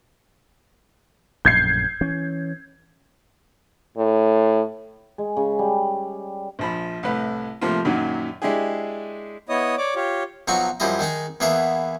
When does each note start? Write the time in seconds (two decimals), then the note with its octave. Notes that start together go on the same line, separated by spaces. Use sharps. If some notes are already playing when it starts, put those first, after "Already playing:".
1.45 A#1 F#2 A2 G6 G#6 C7
2.01 E3 C#4
3.97 A2
5.18 G#3
5.37 C#3
5.59 G3
6.59 A#1 F3 B5
7.03 C2 A2 B4
7.61 A2 C3 F3 A#3 F4
7.85 F#2 A#2 D#3 F#3
8.42 G#3 D4 E4 G4 G#4
9.49 B3 E4 C#5 D#5 D#6
9.78 C#5 D5 D6
9.95 F4 G4 C#5
10.48 B1 F3 F#3 D#4 F#4 C#6
10.80 F#2 F3 G3 G#3 E4 D#5
10.99 D#3 G#3 D#4 G#4
11.40 E2 E3 A#3 B3 G#4 E5